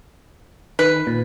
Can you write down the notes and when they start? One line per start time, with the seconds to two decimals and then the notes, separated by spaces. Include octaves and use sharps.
0.79 D#3 B4
1.07 A#2